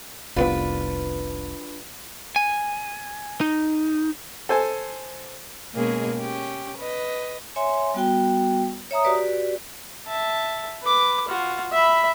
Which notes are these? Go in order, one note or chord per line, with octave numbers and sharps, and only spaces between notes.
F1 C2 B3 D4 F4 B4
G#5
D#4
A4 C5 G#5
B2 G#3 A#3 C#4 G#4
C#4 G4
B4 D#5
C#5 E5 G#5 C6
G3 B3 F#4 G5
C#5 E5 A#5 D#6
F#4 G4 B4 D5
E5 A5
B4 D6
F4 F#4
E5 B5